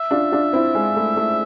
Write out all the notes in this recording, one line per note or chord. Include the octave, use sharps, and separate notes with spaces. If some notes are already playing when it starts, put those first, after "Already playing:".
Already playing: E5
D4 F4
D4 F4
C4 E4
G#3
A3
A3